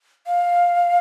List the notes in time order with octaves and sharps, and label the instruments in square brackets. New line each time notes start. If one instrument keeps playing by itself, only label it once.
[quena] F5